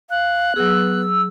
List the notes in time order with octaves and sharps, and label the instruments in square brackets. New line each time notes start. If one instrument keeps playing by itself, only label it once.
[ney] F5 [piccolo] F#6
[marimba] F#3 G#4 [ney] B3 [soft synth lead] E6